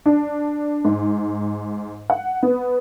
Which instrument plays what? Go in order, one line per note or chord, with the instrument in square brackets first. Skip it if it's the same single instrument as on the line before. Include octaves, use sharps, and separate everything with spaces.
[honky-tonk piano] D4
G#2
F#5
B3